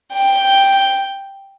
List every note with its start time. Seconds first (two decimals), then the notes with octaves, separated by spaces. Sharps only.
0.13 G5